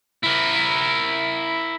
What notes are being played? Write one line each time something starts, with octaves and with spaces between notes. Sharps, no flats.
E4 A#4